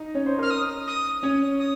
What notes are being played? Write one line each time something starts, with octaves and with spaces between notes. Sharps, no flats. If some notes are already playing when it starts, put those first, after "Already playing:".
Already playing: D#4 D#5
C#4 C#5
C5
A#4 F6
D#6
D#6
C#4 C#5
D#6